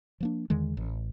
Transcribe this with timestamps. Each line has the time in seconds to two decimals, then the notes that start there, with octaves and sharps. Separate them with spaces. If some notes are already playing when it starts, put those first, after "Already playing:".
0.20 F3 A#3 D4
0.50 E2 D3 D#3 G#3
0.77 A1